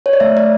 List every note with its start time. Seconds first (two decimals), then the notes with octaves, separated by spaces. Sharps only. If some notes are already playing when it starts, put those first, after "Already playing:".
0.06 C#5
0.13 D5
0.20 A3 E5
0.37 D5